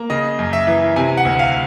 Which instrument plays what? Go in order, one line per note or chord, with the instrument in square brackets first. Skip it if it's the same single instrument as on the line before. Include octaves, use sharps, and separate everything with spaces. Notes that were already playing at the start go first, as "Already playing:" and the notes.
Already playing: [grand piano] A#3
C#3 D#5
F#2
E5
E3
C3 G#5
F#5
D2
F5